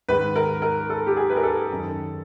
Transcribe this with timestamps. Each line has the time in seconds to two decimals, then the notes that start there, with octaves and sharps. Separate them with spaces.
0.08 G#2 D#3 B4
0.36 A#4
0.62 A#4
0.90 A4
1.06 G4
1.16 G#4
1.30 B4
1.36 A#4
1.43 A4
1.71 F#2 D#3